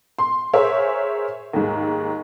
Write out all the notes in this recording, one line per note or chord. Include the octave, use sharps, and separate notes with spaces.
C6
G#4 A#4 C5 C#5 E5 G#5
D#2 G#2